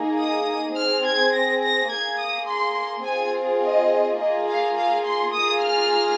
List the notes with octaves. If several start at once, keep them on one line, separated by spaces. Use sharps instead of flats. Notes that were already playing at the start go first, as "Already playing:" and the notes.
Already playing: A#3 D#4 G#4
D#6
C4 G#4 F6
G#6
A#6
A#6
A#3 G#4 G#6
D#6
C6
C4 F4 G#4 G#5
D#5
A#3 F4 G#4 D#5
F5
F5
C6
A#3 F4 G#4 D#6
F6